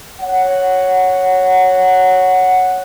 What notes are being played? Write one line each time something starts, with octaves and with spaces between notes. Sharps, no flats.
C#5 F#5